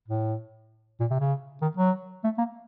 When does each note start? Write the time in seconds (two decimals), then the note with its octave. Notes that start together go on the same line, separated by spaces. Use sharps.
0.08 A2
1.00 A#2
1.11 C3
1.21 C#3
1.62 D#3
1.77 F#3
2.24 A3
2.38 A#3